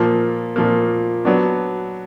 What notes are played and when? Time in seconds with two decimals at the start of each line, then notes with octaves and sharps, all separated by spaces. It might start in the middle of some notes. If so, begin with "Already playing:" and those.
Already playing: A#2 F3 A#3
0.56 A#2 F3 A#3
1.25 F#3 B3 D4